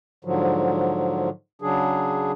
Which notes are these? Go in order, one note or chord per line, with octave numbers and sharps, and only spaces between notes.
G#2 D3 F3 F#3
C#3 F#3 D4 G#4